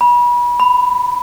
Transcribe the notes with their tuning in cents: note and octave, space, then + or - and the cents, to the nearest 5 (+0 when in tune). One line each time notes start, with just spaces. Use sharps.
B5 -30
B5 +10